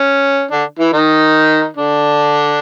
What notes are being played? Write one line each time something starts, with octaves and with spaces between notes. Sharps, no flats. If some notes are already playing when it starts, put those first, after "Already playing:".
Already playing: C#4
D3 D4
E3 E4
D#3 D#4
D3 D4